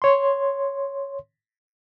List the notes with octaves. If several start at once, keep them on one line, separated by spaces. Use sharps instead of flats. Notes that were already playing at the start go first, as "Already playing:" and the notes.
C#5 C6